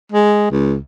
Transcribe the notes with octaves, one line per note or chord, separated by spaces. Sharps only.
G#3
C#2